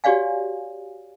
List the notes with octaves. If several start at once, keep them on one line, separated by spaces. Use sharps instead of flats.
F#4 G4 C#5 D5 F5 G#5